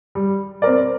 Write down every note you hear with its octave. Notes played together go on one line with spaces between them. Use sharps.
G3
C4 A#4 D5